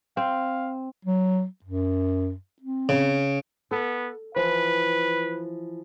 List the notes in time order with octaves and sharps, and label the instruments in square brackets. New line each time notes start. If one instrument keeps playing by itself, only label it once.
[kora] C4 [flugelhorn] F5
[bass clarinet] F#3
F#2
C4
[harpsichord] C#3
[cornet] B3 [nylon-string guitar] A4
[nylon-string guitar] E3 F3 C5 [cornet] B4